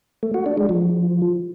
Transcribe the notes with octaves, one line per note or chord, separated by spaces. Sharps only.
A3
F#4
D4
G#3
F3